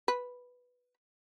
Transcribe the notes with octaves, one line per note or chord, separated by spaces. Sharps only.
B4